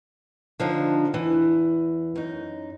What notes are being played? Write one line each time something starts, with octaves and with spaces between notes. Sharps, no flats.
D3 F3 D4 D#4
E2 E3
F#2 D#4